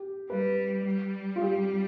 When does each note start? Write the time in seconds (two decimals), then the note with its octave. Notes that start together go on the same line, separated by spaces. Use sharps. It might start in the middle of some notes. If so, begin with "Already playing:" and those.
Already playing: G4
0.30 G3 B4
0.86 G3
1.36 F4
1.42 G4